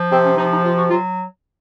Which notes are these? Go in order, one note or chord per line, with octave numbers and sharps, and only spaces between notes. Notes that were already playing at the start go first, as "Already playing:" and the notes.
Already playing: F3
C3 C4
C#4
F3 D#4
D#4
C3 F4
F#4
F#3 F4